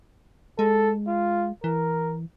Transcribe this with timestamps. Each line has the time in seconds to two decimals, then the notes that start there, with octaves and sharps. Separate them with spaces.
0.59 G#3 A4
1.08 F4
1.64 E3 A#4